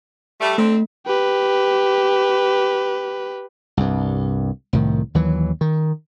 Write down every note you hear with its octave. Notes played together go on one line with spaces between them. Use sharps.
G3 A3
D3 A3 C4
G4 B4
C2 G2
C2 A2 D#3
D#2 E3 F#3
D#3